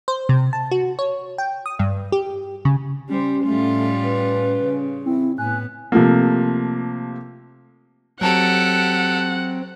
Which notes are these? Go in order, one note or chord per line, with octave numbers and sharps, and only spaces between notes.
C5
C3
A5
F#4
C#5
G5
D#6
G2
G4
C#3
G3 C#4 G4 C5
A2 G3 A3 F4
B4
C#3
C4 E4
A2 B3 G#5 F#6
C3 F3 A3 A#3
F#3 C4 G4 A4 F#5 A5 F7